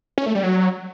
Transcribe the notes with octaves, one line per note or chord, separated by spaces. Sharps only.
C#4
A3
G3
F#3